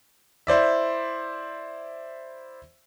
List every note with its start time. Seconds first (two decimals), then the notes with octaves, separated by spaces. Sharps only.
0.47 E4 C5 D5 E5